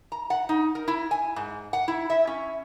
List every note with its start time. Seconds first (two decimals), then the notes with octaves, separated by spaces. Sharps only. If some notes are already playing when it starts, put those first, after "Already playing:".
0.12 A#5
0.30 F#5
0.49 D#4
0.75 A#4
0.88 E4
1.11 G#5
1.36 G#2
1.73 F#5
1.88 E4
2.10 E5
2.27 C#4